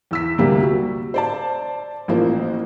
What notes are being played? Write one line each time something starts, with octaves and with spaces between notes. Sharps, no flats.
E2 E6 B6
D2 C3 G3 A#3
F#4
C5 D5 A5
A1 F3 A#3 C5